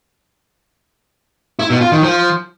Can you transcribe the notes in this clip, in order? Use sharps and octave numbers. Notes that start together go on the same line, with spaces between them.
E4
B2
F4
D#3
F3